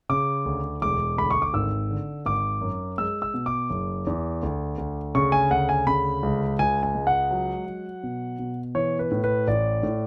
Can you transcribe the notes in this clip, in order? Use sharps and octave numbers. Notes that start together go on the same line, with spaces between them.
C#3 D6
D2
E1 D6
D2 B5
C#6
D6
G#1 E6
D3
G#1 D6
F#2
G#3 E6
E6
B2
D6
F#1
E2
D2
D2
C#3 C#6
G#5
D2 F#5
G#5
C#3 B5
C#2
C#2 G#5
G#5
G#3
F#5
F#3
F#3
B2
B2
E3 C#5
B4
A2
B4
A1 D5
A2